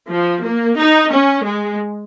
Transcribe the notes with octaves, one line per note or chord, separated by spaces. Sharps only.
F3
A#3
D#4
C#4
G#3